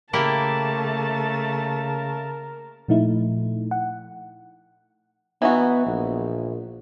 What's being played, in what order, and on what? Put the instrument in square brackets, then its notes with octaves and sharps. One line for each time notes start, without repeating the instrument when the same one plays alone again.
[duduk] C#3 [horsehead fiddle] A3 A5 [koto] A#3 E4 G4 [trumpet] A#4
[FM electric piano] A#2 F3 A3 D#4 E4
F#5
[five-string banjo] E3 D#4 F#4 [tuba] B3
[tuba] A#1